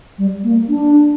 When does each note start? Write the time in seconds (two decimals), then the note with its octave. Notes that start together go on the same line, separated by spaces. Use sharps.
0.18 G3
0.44 A#3
0.69 D4